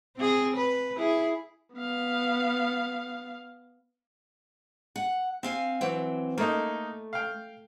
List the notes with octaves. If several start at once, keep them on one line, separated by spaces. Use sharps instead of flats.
C4 G#4
B4
E4 G#4
B3 F5
F#5
C4 F5 G#5
E3 F#3 C4
A3 A#3 D#4
F5 G5